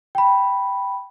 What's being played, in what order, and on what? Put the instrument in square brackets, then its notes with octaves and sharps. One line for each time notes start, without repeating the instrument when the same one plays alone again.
[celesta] G5 B5